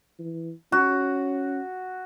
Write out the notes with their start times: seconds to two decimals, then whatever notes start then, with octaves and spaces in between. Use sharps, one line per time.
0.19 E3
0.72 C#4 F#4